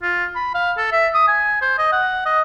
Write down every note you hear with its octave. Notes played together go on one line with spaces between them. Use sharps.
F4
B5
F5
A4
E5
D#6
G#5
C5
D#5
F#5
D#5